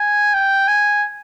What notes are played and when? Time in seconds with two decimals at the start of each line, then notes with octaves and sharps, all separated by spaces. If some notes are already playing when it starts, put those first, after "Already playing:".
Already playing: G#5
0.34 G5
0.68 G#5